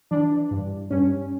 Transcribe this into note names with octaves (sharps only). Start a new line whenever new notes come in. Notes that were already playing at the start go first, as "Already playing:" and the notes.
E3 D4
G2
G2 C#4